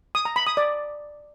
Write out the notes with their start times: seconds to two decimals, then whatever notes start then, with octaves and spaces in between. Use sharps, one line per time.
0.15 D#6
0.25 A#5
0.36 B5
0.47 D#6
0.57 D5